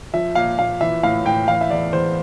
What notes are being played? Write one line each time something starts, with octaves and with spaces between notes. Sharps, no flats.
F3 E5
A#2 F5
A#2 F5
E3 E5
A2 F5
A2 G5
E3 F5
E5
E2 D5
E2 C5